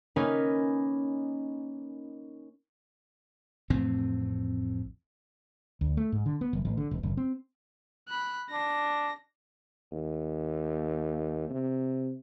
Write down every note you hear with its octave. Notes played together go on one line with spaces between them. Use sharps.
A#3 C#4 D#4 A#4 B4 G#5
A1 F2 A2 C4
D2
A3
G#2
D3
B3
F#1
A1
D3
E1
F#1
C4
B5 F#6
D4 A#6
D#2
C3